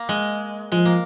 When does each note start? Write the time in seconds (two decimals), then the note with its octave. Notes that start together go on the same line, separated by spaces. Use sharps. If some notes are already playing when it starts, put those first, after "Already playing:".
Already playing: A#3
0.09 G#3
0.72 F3 G#3
0.85 A#3